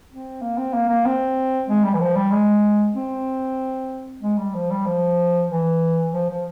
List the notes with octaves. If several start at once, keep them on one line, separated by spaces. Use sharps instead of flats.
C4
A#3
C4
A#3
A#3
C4
G#3
G3
E3
F3
G3
G#3
C4
G#3
G3
F3
G3
F3
E3
F3
F3